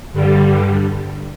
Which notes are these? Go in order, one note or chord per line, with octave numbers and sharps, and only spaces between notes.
G2 D3 G3